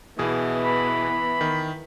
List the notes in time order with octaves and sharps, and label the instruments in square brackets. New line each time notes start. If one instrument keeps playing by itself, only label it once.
[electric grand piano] B2 G#4 D#6 [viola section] E3 B3
[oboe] B5
[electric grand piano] D#3